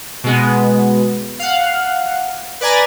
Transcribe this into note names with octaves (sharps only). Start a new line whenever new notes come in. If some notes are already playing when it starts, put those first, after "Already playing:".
B2 G#3 B3
F5 F#5
B4 D5 G#5 A#5 A6